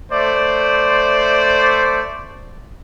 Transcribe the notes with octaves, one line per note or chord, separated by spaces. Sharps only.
A3 C5 D5